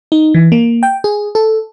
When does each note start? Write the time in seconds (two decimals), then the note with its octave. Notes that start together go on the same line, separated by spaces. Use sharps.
0.12 D#4
0.34 E3
0.52 A#3
0.83 G5
1.04 G#4
1.35 A4